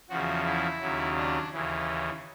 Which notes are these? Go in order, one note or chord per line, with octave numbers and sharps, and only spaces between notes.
E2 C#3 F3 F#4
E4
D#2 C#3 F#3
D4
D#2 C#3 E3